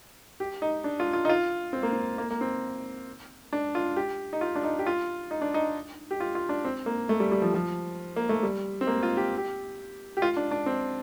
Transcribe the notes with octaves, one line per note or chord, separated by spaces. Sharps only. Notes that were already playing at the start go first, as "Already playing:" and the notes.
G4
D#4
D4
F4
F4
D#4
F4
C4
A#3
C4
A#3
A#3
C4
D4
F4
G4
D#4
F4
D4
D#4
G4
F4
D#4
D4
D#4
G4
F4
F4
D4
C4
A#3
A3
G3
G3
F3
F3
A#3
A3
G3
C4
A#3
F4
G4
G4
G4
F4
D4
D4
C4